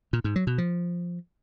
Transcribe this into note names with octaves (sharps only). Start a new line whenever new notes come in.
A#2
G#2
F#3
B2
F3